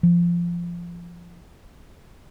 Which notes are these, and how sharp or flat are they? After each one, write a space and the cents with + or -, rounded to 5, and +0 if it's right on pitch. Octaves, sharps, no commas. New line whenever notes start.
F3 -15